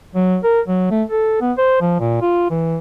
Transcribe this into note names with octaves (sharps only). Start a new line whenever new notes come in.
F#3
A#4
F#3
A3
A4
B3
C5
F3
A#2
F4
E3